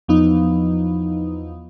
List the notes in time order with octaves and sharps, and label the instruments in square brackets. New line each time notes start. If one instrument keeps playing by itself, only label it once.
[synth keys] E2 F3 B3 D#4